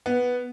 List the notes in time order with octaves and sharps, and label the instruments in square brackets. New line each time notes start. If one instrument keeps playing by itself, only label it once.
[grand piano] B3